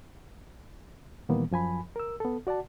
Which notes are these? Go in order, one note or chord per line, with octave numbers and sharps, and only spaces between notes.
A#2 D#3 E3 G3 A#3 B3
F#2 F3 G#5 B5
A#4 E6
B3 A4
F#4 D5 F#5 A5